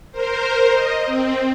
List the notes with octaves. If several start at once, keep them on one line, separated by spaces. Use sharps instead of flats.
A#4 C5
D#5
C4